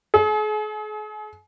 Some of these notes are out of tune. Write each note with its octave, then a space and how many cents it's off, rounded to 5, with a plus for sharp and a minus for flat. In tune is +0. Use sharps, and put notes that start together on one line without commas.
G#4 +40